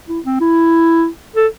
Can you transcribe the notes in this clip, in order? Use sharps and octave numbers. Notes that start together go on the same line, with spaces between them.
E4
C4
E4
A4